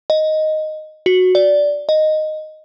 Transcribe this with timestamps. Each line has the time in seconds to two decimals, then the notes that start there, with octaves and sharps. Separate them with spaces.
0.10 D#5
1.06 F#4
1.35 D5
1.89 D#5